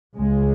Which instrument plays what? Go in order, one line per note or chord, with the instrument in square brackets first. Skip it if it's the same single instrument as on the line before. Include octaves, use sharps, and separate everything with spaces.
[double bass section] C#2 C#3 G#3